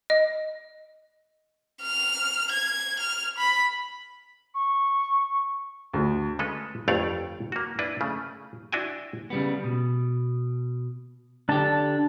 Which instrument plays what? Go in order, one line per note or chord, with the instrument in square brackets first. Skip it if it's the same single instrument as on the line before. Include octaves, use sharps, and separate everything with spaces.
[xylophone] D#5
[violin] F6
G#6
F6
B5
[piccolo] C#6
[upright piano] D2
[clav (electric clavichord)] C#3 G#3 A4 B4
G1 F2 A3 C#5 D5 F5
A#3 F#4
D4 E4 B4
C#3 A3
D4 E4 F#4 G5 G#5
[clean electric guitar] C#3 G3 B3
B2
[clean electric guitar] D3 G4 [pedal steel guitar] D4 A5